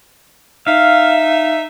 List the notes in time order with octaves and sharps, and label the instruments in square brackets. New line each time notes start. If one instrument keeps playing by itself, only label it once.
[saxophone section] D#4 E5 [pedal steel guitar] F5